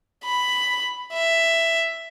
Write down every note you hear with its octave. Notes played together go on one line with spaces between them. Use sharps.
B5
E5